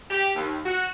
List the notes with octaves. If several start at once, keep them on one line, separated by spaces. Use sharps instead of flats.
G4
D#2
F#4